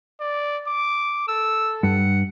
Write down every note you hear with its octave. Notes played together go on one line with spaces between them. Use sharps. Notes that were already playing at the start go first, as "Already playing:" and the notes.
D5
D6
A4 E6
G2 F#5